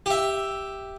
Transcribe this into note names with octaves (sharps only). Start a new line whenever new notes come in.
G4 E5